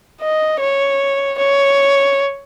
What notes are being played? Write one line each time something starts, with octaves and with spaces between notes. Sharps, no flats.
D#5
C#5
C#5